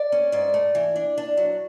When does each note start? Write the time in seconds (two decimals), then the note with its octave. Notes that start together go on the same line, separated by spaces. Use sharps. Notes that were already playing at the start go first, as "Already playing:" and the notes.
Already playing: D5
0.12 C#4
0.32 G#2 D5
0.54 A3
0.75 E3
0.96 D4
1.18 D4
1.37 F#3